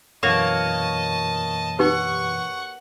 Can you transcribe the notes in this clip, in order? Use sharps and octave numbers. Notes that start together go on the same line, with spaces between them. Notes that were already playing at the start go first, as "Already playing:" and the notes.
F#2 B2 E3 A#3 F#4 C#5 D#5 A5
D#4 G4 B4 F#5 C#6